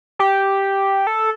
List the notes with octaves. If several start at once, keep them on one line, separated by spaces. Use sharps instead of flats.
G4
A4